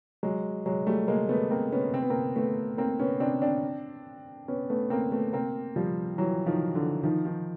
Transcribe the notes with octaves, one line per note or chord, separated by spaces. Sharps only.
F#3 G#3
F#3 G#3
G3 A3
G#3 A#3
A3 B3
A#3 C4
B3 C#4
C4
B3
A#3 C4
A3 B3
A#3 C4
B3 C#4
C4 D4
C4 D4
B3 C#4
A3 B3
A#3 C4
A3 B3
A#3 C4
F3 G3
E3 F#3
D#3 F3
D3 E3
D#3 F3
D#3 F3